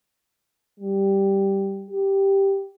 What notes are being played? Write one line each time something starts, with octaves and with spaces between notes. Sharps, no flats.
G3
G4